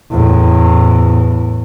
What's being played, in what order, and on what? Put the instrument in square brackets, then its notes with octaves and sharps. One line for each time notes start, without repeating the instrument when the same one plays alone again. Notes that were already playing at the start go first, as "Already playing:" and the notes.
[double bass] E2 A2